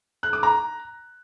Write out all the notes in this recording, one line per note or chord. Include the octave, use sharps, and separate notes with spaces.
F#6
D6
A#5